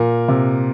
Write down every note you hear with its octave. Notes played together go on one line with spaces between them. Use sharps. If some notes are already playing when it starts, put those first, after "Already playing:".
Already playing: A#2 A#4
C3